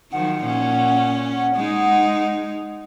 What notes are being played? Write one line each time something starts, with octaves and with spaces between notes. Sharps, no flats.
D#3 F3 F#3 F#5
A#2 C#4
G#3 D#4